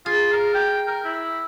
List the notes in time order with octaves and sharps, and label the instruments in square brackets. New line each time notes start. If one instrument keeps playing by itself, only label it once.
[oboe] F4 [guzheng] G#4
[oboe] A#4
G5
A#4
E4